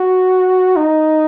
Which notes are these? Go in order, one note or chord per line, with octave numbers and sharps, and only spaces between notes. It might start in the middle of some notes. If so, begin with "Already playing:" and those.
Already playing: F#4
D#4